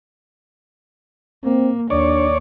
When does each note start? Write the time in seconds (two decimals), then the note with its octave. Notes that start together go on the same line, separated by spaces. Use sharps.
1.44 A#3 C4
1.90 D#2 D4 C#5 D5